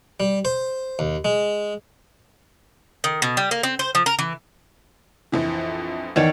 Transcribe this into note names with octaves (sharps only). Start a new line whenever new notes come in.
G3
C5
D#2
G#3
D#3
B2
G3
A#3
C4
C5
F3
A#4
E3
A#1 F2 E3
E2 D#3 C#5 D5